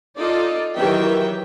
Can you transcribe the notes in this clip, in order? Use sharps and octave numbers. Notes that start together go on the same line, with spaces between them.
D#4 F4 A4 D5
D#3 E3 F#3 G4 E5 G5